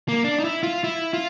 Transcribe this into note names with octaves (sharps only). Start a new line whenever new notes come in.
A#3
D4
D#4
E4
F4
E4
F4